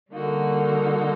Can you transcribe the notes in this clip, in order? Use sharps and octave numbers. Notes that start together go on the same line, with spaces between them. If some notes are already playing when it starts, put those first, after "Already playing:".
D3 G3 A#3 D#4 F#4